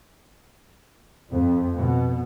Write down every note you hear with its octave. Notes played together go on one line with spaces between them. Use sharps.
F2
B2